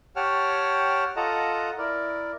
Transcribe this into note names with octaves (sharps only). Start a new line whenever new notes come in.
G4 C#5 F#5 G5 A5 F6
F4 A4 D#5 F#5 A5 A#5
E4 A#4 D5